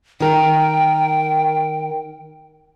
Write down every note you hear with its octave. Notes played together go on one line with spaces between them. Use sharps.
D#3 A#4 G5